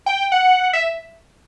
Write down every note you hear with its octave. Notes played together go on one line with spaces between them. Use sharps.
G5
F#5
E5